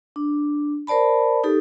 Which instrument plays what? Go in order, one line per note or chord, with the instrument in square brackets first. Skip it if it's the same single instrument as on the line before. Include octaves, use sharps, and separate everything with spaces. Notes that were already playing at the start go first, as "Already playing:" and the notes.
[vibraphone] D4
A#4 C5 D5 A5 B5
D#4 G4 A4